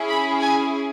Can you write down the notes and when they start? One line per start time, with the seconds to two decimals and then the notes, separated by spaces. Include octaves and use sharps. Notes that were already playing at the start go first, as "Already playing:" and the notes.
Already playing: C#4 E4 G#4
0.09 B5
0.41 G#5